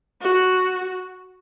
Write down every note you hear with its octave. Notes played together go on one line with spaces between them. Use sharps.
F#4